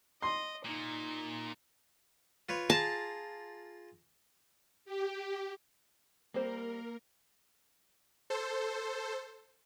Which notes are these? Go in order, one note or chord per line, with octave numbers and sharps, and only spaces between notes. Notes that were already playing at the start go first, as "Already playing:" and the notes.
D#5 C6
A#2 D#4
F4 B4 C#5
F4 G#4 A5 A#5
G4
G3 A#3 C4 A#4 C5
A4 C5